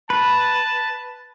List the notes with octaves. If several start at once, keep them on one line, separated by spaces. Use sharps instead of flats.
B4 A5